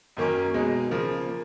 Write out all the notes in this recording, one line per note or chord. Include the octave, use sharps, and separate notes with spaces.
F#2 D#3 A#3 C#4
B2 G#3 D#4
C#3 F3 A#3
A#3